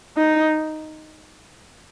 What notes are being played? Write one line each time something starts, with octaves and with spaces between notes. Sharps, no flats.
D#4